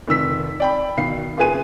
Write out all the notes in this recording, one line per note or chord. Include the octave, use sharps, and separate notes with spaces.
F1 D#3 E6 B6
D5 G5 B5
B2 D#3 F5 C7
F#1 F4 G#4 B4 G#5 D#7